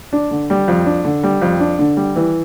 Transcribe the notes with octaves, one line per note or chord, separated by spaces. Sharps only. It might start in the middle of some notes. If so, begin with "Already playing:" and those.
D4
D3
G3
F2
D4
D3
G3
F2
D4
D3
G3
E3